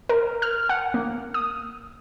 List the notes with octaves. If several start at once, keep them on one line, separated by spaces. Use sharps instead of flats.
A#4
F6
F#5
A#3
D#6